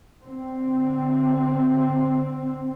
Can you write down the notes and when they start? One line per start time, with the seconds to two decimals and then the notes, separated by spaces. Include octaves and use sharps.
0.21 D3 C4